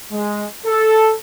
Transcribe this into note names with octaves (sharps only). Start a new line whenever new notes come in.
G#3
A4